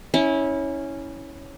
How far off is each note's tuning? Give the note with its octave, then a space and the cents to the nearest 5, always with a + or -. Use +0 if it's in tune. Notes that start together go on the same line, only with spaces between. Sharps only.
C#4 +0 E4 -25